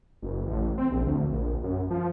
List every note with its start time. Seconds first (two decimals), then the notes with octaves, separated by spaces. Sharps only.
0.22 F#1
0.47 A1
0.78 C4
0.91 A#1
1.06 D2
1.31 A#1
1.63 F#2
1.90 F3